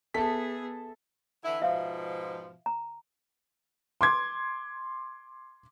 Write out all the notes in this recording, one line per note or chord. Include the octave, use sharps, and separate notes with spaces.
B3 G#4 A4 E5 A5 B6
D3 E3 E4
G#2 B2 F3 E5 F5
A#5
C6 D6 G#6